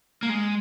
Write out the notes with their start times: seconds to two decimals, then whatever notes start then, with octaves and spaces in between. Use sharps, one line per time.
0.23 A#3
0.29 G#3